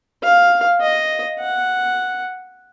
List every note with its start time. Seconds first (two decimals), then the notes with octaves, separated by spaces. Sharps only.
0.23 F5
0.81 D#5
1.40 F#5